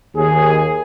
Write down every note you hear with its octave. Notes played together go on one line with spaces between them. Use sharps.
D#2 G#4